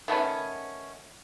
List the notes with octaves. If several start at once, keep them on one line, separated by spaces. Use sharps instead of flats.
D#3 A3 B3 C#4